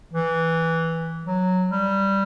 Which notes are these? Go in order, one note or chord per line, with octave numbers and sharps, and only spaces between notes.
E3
F#3
G3